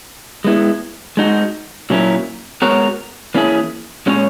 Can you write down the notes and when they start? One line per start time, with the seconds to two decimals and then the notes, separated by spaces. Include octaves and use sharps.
0.45 G#3 B3 E4
1.17 G#3 D#4 F#4
1.90 A#2 F#3 C#4 E4 A#4
2.62 G#3 B3 F#4 A#4 C#5
3.34 E3 A#3 C#4 E4 G#4
4.06 A#2 G#3 C#4 G#4 C#5